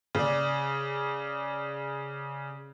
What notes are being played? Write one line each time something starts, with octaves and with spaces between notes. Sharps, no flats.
C#3 D5